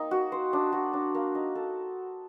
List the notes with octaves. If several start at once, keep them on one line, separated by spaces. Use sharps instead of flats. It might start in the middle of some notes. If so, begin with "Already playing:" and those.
Already playing: A#3 C4 D#4
F#4
C5
D4
F#4
D4
A#3
D#4
A4